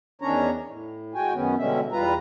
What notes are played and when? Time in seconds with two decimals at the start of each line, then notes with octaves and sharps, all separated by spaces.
0.22 E2 D#3 C#4 D4 C#5 A#5
0.69 A2
1.14 G#3 F#4 G5 G#5
1.34 F#2 D#3 B3 C#4
1.58 B2 D3 G3 G#3 C#4 E5
1.92 E2 G3 F4 B4 A#5